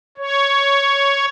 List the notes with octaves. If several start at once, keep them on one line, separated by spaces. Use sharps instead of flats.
C#5